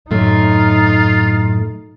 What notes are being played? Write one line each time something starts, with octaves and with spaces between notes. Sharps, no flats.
F#2 A2 A3 D#4 F4